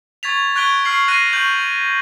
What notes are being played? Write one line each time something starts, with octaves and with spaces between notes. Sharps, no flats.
C#6 G#6 A6 B6 F7
C#6 F#6 G#6 B6 D7 G7
C#6 F6 C7 F#7
F#6 A#6 C7 D#7
C#6 G6 F#7